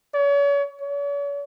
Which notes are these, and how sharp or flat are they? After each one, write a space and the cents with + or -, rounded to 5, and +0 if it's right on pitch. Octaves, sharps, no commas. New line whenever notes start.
C#5 +40
C#5 +45